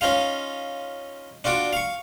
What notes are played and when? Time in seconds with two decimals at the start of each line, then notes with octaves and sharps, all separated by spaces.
0.01 C#4 D#4 F4 F5
1.44 D4 F4 F#4 D5
1.73 F5 C#6